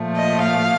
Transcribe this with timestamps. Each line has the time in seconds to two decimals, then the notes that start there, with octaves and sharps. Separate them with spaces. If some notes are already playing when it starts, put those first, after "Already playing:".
Already playing: A#2 F3 A3
0.15 D#5
0.44 F5